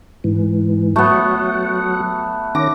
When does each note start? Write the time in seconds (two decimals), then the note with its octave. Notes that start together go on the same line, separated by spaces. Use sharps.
0.24 G#2 E3
0.96 F#3 A3 B3 F#5
2.55 D#3 C#4 D6 A#6